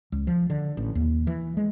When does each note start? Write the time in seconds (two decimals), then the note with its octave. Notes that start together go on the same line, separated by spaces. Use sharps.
0.12 C#2
0.27 F3
0.50 D3
0.77 A1
0.95 D#2
1.27 E3
1.57 G#3